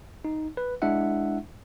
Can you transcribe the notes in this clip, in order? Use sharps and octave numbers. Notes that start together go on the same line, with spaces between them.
D#4
B4
G#3 D4 E4 E5 F#5